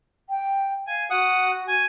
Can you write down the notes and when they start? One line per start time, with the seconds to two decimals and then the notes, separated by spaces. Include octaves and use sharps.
0.29 G5
0.87 F5 G#5
1.10 F#4 F#5 D#6
1.68 G#5